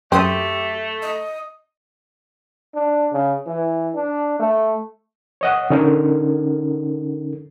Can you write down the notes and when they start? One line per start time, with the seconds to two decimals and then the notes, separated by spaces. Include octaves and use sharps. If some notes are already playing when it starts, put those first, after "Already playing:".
0.12 F#2 A3 C4 G4 D#6
1.02 D#5
2.75 D4
3.13 C#3
3.46 E3
3.95 D4
4.40 A3
5.41 C#5 D#5 F#5
5.70 D3 C#4 D#4 A4 A#4